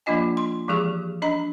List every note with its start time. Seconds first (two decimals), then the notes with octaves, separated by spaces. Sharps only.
0.06 F3 A#3 D4 F4 D#5 G#5
0.37 C6
0.68 E3 F3 G#3 G4 G#4 C#6
1.22 D4 D#5 A#5